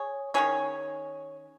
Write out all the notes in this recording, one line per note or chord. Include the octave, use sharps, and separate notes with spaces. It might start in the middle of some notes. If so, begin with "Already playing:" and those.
Already playing: G#4 C#5
D#3 G#3 C#4 G#4 C#5